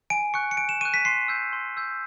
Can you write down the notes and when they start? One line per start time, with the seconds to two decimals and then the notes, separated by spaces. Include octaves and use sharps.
0.10 G#5 D7
0.34 C#6 F#6 C#7
0.51 C#7
0.57 G#5 D7
0.69 E7
0.81 C#6 F#6 D#7
0.94 B6
1.05 C6 C7
1.28 E6 G6
1.53 C6
1.77 E6 G6